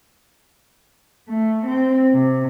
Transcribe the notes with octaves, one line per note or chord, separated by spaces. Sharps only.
A3
C4
C3